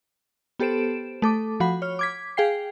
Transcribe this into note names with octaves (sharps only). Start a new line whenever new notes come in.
B3 G4 A4 C5 D7 E7
A3 A4 D6
F3 F#4 F#5 B5
C#5 F6
D6 G#6 B6
G#4 F5 G5 C7